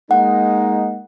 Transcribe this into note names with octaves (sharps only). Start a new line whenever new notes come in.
G#3 A#3 D#4 F#5